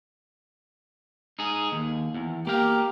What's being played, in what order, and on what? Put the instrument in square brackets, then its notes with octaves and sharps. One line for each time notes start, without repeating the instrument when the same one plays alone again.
[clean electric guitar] D#4 G#4
D#2
E2
[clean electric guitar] A#3 F5 [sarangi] G4